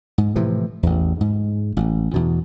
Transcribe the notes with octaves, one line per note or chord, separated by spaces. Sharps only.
G#2
A2 C3 E3 F3
A1 E2
G#2
A1
E2 B2